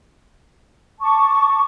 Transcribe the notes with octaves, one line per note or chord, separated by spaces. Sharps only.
A5 C#6 D6